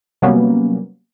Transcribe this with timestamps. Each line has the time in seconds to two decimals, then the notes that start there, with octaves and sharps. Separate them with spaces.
0.22 C3 F#3 G3 A#3 B3 C#4